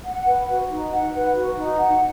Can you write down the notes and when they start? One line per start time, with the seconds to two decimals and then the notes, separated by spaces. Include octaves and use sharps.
0.05 F#5
0.27 B4
0.49 F#4
0.70 D#4
0.91 F#5
1.13 B4
1.35 F#4
1.56 D#4
1.78 F#5